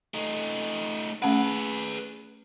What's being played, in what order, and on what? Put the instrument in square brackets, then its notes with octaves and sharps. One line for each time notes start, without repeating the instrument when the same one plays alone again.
[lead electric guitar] A3 D#4
[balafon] A3 C#4 F#5 [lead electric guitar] G#4 B4